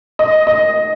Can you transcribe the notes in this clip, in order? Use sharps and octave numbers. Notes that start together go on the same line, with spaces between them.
D#5
D#5